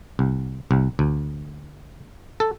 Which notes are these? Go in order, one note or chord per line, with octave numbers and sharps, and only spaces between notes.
C2
C2
D2
A4